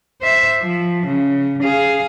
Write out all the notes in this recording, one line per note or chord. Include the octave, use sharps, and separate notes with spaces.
C5 E5
F3
C#3
G#4 F5